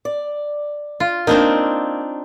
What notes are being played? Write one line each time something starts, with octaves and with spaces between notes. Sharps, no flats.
D5
F4
A#3 C4 D4 D#4